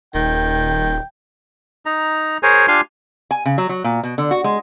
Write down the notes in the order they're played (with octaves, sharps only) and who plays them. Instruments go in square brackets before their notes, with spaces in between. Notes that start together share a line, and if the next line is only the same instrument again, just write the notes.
[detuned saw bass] D#1 [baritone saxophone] D#3 [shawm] G5
[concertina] D#4 A#5
G#4 A#4 C5 C#5 G#5
D4 F4 G4 F5 G#5 C6
[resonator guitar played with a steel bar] G#5
C#3
F#3
F#3
A#2
B2
D3
F#4
G#3